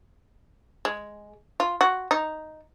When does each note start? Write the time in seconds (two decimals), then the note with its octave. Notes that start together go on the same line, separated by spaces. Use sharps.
0.85 G#3
1.60 F4
1.81 F#4
2.11 D#4